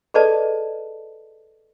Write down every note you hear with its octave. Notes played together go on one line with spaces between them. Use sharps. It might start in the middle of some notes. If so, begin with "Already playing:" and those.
G#4 A4 B4 D5 D#5 A5